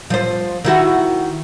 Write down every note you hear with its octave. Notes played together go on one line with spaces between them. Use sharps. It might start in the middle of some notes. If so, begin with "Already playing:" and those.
F3 C5
D#3 E4 F#4